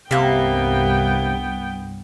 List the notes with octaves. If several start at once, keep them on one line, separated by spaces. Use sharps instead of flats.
C2 G2 C3 G3 A#3 B3 E5 G5